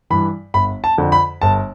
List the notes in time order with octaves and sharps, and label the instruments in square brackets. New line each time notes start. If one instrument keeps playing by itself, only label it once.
[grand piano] G2 E3 B5
G1 B5
A5
F2 D3
B5
G1 A5